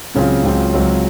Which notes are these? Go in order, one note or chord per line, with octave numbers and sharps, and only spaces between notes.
C#2 C#3 F#3 C4 F4
C#2 C#3 F#3 C4 F4
C#2 C#3 F#3 C4 F4